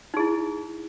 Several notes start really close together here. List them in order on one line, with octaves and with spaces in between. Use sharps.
D#4 G#4 E4